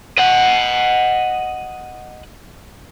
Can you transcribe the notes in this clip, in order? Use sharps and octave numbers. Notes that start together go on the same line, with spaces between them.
D#5 F#5